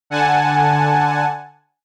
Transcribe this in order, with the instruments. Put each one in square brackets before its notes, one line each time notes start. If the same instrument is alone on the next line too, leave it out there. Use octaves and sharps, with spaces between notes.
[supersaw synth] D3 F#5 G#5 A5